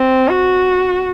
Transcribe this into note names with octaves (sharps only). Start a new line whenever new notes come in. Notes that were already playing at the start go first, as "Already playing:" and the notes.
Already playing: C4
F#4